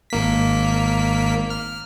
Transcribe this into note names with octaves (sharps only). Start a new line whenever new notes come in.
G#1 A#3 B6
F6